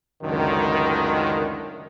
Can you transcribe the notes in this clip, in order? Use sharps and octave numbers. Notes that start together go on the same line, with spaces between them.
C#2 F#2 A2 D3 D#3